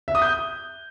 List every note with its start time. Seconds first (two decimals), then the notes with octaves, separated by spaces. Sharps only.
0.08 E5
0.15 D#6
0.22 G6